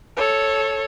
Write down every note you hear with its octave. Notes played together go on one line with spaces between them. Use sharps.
A4 C#5